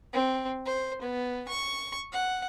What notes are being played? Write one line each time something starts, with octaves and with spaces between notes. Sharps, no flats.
C4
C5
B3
C#6
F#5